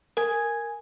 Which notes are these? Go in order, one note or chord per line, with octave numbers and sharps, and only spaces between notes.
A#4 G#5